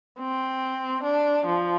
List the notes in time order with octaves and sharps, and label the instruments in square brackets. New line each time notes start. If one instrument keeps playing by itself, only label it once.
[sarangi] C4
D4
F3